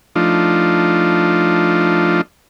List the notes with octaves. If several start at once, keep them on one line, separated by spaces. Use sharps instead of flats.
F3 A3 D4 D#4 F4